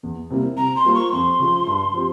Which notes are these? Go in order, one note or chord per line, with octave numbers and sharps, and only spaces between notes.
E2
C3 G3 A#3 E4
C3 A#5
C6
G3 A#3 F4 C5
C#6
F2 C6
C#3 F3
G2
F3 C4 G4